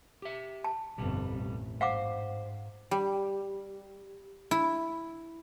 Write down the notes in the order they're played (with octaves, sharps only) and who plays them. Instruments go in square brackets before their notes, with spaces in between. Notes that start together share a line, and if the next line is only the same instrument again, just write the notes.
[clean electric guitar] G4 E5
[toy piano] A5
[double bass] G1 F2 [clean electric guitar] B2 G3
[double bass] A1
[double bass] G#2 [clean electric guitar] C5 [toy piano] F5 F#5 D6
[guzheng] G3
E4